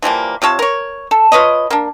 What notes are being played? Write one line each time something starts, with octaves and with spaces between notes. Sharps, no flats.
E3 F3 G3 A#3
C3 F4 C#5 A5
A#4 C#5
A4
F4 B4 C#5 D#5
A#3 D4